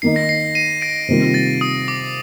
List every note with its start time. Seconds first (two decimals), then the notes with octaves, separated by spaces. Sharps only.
0.02 D#3 A#3 D#4 C7
0.16 A#6
0.29 C7
0.55 C7 D#7
0.81 A#6 D7
1.08 C3 D#3 G3 A#3 F4
1.34 A6
1.61 D#6
1.88 D6